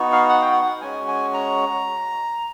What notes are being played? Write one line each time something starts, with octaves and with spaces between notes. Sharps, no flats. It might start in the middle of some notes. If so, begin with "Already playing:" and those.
Already playing: B3 D#4 F#4
F5
F#5
G5
F#5
G#3 C#4 F#4 G#5
G#5
A#5